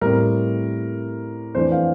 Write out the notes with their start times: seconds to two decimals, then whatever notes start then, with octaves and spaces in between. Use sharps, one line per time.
0.01 A2 G3 C4 A#4
1.54 F2 E3 A3 D4 C5
1.72 F5